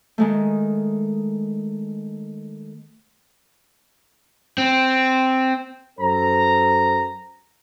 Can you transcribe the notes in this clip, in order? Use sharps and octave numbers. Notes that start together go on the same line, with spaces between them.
D#3 G#3 A3
C4
F#2 A4 C5 A#5